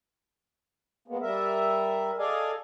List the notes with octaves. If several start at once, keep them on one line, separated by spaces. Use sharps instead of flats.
G#3 A#3 B3
G3 A#4 E5
G#4 A4 D5 D#5 F5 G#5